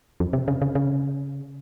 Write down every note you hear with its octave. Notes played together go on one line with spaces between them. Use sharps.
F2
C3
C#3
C#3
C#3